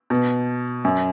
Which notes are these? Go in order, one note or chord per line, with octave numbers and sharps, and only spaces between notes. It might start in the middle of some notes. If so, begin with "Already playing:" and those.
B2
F#2